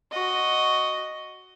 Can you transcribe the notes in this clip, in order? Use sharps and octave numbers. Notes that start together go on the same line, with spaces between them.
F#4 D#5